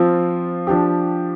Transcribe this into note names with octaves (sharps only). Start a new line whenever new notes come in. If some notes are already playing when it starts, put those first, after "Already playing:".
Already playing: F3 C4 F4
F3 D4 G4